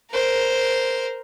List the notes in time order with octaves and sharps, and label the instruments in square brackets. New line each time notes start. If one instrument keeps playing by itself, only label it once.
[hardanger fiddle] A#4 C5